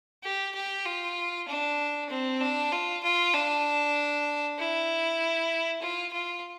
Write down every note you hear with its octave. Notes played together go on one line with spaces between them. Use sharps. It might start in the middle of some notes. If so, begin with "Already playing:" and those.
G4
G4
F4
D4
C4
D4
F4
F4
D4
E4
F4
F4